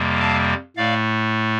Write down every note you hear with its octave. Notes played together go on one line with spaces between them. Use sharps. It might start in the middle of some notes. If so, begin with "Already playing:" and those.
Already playing: F2 C3 G3 A#3
F5 A5
A2 A3 D5 F5